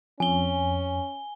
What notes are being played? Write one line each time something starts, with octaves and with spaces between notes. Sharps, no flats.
F2 C#4 G#5 G7